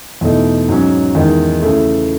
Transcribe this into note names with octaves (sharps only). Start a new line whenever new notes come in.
E2 B2 A3 D#4
G#2 F#3 C#4
E2 D#3 G#3 D#4
C#3 E3 A3